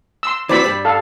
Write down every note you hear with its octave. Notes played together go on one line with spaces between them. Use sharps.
C6 E6
E3 C4 F#4 D5 B5 E6
G2 G3
A4 F5